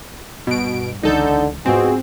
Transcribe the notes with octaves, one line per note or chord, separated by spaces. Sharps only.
G2 B2 D7
C#2 D3 E3 D#4 A4 G6
G#2 B2 C4 F4 F#4 G#4